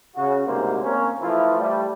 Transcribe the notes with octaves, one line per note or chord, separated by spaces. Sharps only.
C#3 F#4
D2 G#2 C3 G3 A#3 C5
A#3 C4 C#4
E3 F3 A3 E4 F4
G3 A3